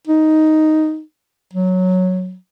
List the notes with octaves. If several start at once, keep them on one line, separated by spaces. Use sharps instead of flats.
D#4
F#3